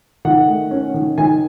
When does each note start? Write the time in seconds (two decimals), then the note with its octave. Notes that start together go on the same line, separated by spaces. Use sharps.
0.25 D#3 F#5
0.48 A3
0.71 C#4
0.94 D#3
1.18 D#3 G#5